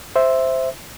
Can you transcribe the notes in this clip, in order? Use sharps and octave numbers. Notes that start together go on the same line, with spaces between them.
C5 E5